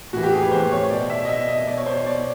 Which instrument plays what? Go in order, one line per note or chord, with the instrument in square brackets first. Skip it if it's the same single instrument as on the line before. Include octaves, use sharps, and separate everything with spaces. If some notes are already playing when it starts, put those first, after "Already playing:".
[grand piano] A2 E3 F#4
G4
G#4
B4
A2 E3 C5
C#5
B2 D5
E5
D#5
B2 E5
D#5
B2 D5
C#5
C5
C#5
B2 D5